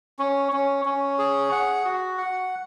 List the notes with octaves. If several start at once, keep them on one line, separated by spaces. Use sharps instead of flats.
C#4
C#4
C#4
G#4
F#5
F#4
F#5